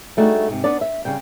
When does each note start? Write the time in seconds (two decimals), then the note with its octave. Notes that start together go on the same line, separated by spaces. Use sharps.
0.17 G3 A3 D4 D#4 F#4 G#4
0.48 G#2 C3
0.64 B3 D4 D5
0.81 E5
1.05 C#3 G3 G5